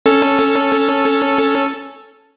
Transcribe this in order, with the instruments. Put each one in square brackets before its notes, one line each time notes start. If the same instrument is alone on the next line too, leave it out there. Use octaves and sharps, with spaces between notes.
[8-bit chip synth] C#4 A4